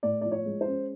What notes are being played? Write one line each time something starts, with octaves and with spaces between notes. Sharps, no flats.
A2 D5
F3 D5
C#5
G#3
C5
C#4